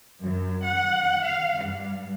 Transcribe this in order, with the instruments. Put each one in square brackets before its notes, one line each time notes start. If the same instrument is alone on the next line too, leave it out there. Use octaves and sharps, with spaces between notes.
[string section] F#2
F#5
F5
G2